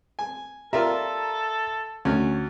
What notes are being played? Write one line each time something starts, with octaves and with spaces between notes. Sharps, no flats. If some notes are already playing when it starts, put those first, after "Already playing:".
G#5
F4 G4 A4 A#4 D5 E5 A#5
D2 C#4